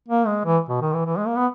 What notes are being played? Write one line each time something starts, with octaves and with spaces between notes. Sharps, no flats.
A#3
G#3
E3
B2
D#3
E3
E3
G#3
A#3
B3